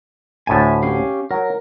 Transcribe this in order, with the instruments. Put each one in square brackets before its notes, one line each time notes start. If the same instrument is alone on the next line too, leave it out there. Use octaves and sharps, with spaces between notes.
[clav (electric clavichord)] D2 A2 A5 [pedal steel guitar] E5 G#5
[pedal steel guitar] C#4 G4 F5
[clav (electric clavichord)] F#3 [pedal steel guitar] A#4